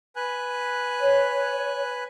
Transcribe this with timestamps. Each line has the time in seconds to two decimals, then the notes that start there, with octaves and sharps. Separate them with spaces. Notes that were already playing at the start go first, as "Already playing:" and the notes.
0.16 B4 G#5 F#6
1.00 C#5